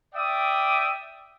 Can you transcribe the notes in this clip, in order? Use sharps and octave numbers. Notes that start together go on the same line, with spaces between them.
D5 E5 G5 D6 D#6